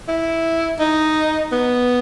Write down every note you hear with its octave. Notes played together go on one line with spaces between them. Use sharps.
E4
D#4
B3